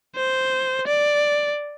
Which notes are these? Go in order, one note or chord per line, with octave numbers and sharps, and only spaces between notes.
C5
D5